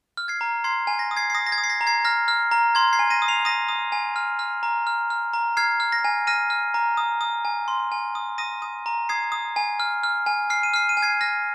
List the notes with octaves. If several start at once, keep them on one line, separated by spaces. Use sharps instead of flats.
F6
G#6 C7
A#5
C6 G#6 C7
G#5
A#6
D#6
G#6 C7
C7
D#6 A#6
A#6
G#6
D#6
C7
A#6
A#5
G#6 C7
F6 A#6
F6
A#5
C6 G#6
G#6 C7
G#5
A#6 D#7
D#6
C7 F7
D#6 A#6 D#7
D#6
G#5
F6
F6
A#5
F6
F6
A#5
F6 G#6 C7
F6
A#6
G#5
F6 A#6 D#7
F6
A#5
D#6
D#6
G#5
C6
G#5
D#6
D#6 A#6 D#7
D#6
A#5
D#6 G#6 C7
D#6
G#5
F6
F6
G#5
F6 C7
D#7
F6 C7
D#7
G#5
G#6 C7
F6 A#6